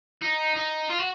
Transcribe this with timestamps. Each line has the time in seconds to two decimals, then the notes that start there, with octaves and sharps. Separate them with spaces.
0.22 D#4
0.56 D#4
0.89 F4
0.99 F#4